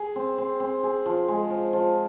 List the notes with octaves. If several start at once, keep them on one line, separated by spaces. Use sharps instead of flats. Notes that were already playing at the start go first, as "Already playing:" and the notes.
Already playing: G#4
C4
C4
C4
G#4
F3
G#3
F3
F3